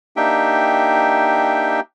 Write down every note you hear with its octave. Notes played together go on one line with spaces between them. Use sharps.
A#3 D4 D#4 G4 E5 G5